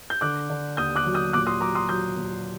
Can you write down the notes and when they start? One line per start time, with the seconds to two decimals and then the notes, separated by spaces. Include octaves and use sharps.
0.10 G6
0.21 D3 D6 F#6
0.50 D3
0.77 D#2 D#6 G6
0.96 D6 F#6
1.06 F#3
1.14 D#6 G6
1.33 A#2 D6 F#6
1.47 C6 D#6
1.61 F#3 A#5 D6
1.75 C6 D#6
1.89 F#3 D#6 G6
2.17 A#2